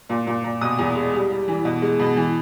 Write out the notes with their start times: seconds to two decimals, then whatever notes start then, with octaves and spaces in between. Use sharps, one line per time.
0.09 A#2
0.27 A#2
0.44 A#2
0.61 B2 D#6
0.79 E2
0.96 G#3
1.13 G3
1.30 G3
1.48 E3
1.65 B2
1.82 G#3
1.99 B2
2.17 E3